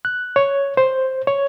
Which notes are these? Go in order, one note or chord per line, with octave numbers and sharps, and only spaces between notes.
F#6
C#5
C5
C#5